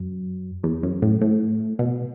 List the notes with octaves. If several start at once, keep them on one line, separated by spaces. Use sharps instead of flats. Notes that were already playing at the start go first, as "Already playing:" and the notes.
Already playing: F#2
E2
F#2
A2
A2
B2